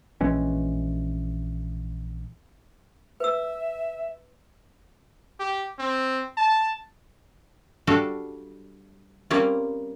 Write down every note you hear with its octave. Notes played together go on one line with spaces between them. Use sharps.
A#1 E3 G#3 C#4
B4 E5 E6
G4
C4
A5
G3 D4 F#4 A4 F5
G3 A#3 C4 C#4 F4